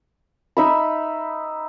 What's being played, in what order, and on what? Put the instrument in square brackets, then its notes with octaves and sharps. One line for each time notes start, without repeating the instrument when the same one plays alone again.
[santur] D#4 E5 B5